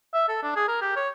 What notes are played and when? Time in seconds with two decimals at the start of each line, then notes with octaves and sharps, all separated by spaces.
0.14 E5
0.29 A4
0.42 D4
0.56 G#4
0.68 A#4
0.81 G4
0.96 C#5